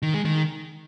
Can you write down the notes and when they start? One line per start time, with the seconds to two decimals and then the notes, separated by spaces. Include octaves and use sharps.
0.02 D#3
0.14 G#3
0.25 D#3